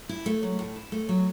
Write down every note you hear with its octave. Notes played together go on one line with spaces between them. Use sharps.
E4
A3
F#3
A2
E4
A3
F#3